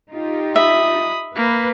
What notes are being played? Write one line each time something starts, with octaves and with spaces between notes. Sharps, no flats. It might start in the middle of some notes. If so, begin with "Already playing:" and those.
D#4 F4 G4
E5 B5 D#6
A#3 B4